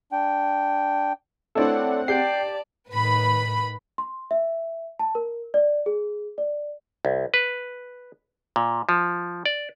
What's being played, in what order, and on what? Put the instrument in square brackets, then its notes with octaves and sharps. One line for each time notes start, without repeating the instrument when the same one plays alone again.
[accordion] D4 G5
[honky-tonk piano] A3 D4 E4 [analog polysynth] C4 F#5 [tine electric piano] A4 C#5 D5
[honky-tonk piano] G4 [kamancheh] D5 A5 [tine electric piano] G5 G6 C7
[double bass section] A2 D#3 [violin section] B4 B5
[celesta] C6
E5
A5
A#4
D5
G#4
D5
[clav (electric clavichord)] C2
B4
A#2
F3
D5